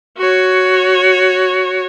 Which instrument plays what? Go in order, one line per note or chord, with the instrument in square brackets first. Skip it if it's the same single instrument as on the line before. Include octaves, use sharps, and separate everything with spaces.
[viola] F#4 C#5